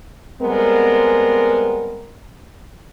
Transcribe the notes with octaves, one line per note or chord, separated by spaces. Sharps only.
G3 G#3 B3 C4 A#4